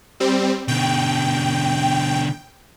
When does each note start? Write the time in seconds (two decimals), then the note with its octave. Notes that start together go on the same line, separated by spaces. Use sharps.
0.20 G3 C4
0.68 B2 D3 G5